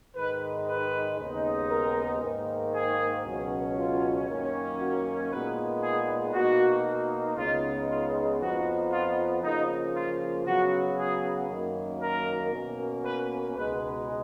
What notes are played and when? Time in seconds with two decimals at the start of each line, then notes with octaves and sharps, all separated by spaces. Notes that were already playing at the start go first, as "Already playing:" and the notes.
0.15 G#2 D#3 G#3 B4
0.67 B4
1.19 D#2 C#3 G#3 B3 D#4
1.69 A#4
2.21 G#2 D#3 A#3
2.73 G#4
3.24 C#2 B2 F#3 C#4
3.77 F4
4.28 F#2 D#3 A#3 C#4
4.80 F#4
5.30 A#2 G#3 B3 D#4 B4
5.82 G#4
6.33 B2 A#3 D#4 F#4
7.37 C#2 C#3 G#3 B3 D#4 F4
7.89 F4
8.40 F2 F3 B3 D#4 F#4
8.92 F4
9.43 C#3 F3 A#3 D#4
9.95 F4
10.46 C#3 F#3 B3 F#4
10.98 G#4
11.49 F#2 D#3 A#3
12.01 A#4
12.52 B2 A#3 C#4
13.04 B4
13.55 C#2 B2 G#3 D#4 B4